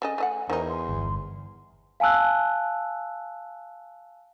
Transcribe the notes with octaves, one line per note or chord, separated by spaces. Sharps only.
C#3 A4 D#5 G#5
A3 D#5 F#5
E2 D#3 D#4 C5
C6
G1
F5 G#5 A5 E6 F#6